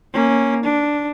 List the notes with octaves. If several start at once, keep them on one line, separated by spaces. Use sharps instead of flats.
A#3 C#4
D4